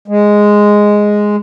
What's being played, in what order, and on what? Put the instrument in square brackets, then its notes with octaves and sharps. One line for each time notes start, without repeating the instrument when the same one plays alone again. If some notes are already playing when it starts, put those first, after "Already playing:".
[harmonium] G#3